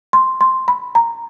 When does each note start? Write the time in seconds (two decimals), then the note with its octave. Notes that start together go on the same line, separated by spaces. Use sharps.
0.13 C6
0.41 C6
0.68 B5
0.95 A#5